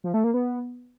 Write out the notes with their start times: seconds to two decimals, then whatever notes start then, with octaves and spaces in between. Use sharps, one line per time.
0.04 F3
0.14 A3
0.24 A#3
0.34 B3